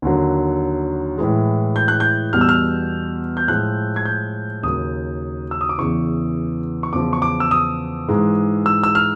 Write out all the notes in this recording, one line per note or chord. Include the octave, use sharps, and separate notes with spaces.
D#2 D3 F#3
A2 E3 G#3
G6
F#6
G6
E2 B2 G3 F6
E6
F6
G6
A2 F3 G#3 F#6
G#6
G6
D#2 C#3 F#3 D#6
E6
D#6
D6
E2 C#3 E3 C#6
C#6
E2 C#3 F3 D6
C#6
D6
E6
D#6
G#2 E3 G#3
E6
E6
F6